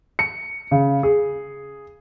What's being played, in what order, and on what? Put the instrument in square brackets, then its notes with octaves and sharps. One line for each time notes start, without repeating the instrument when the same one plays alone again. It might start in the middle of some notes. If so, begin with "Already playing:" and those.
[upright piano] C#7
C#3
G#4